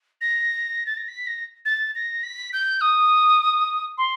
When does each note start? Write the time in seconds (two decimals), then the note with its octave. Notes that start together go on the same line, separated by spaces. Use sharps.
0.21 A#6
0.86 A6
0.97 A#6
1.08 B6
1.26 A#6
1.65 A6
1.95 A#6
2.23 B6
2.53 G6
2.81 D#6
3.97 C6